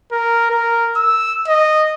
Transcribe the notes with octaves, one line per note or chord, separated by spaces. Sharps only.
A#4
A#4
E6
D#5